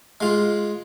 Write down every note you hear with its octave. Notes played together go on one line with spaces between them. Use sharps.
G#3 F4